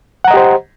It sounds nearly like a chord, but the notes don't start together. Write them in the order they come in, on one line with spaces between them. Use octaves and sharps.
F#5 A#5 D#5 G4 C5